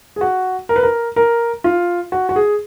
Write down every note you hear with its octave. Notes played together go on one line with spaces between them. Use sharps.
G#4
F#4
A#4
B4
A#4
A#4
F4
F#4
F#4
G#4